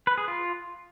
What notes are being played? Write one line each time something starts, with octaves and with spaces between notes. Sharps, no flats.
B4
G#4
F4